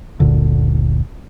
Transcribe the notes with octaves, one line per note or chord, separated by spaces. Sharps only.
F#1 D2 A#2 D3